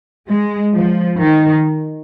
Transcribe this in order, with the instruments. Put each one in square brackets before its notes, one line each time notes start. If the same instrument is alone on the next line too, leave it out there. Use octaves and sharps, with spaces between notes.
[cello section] G#3
F3
D#3